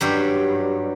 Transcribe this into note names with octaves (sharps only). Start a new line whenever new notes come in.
G2 F#3 G4